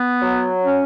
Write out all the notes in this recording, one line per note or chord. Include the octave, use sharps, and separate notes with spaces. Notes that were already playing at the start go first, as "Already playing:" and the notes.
Already playing: B3
F#3
C#4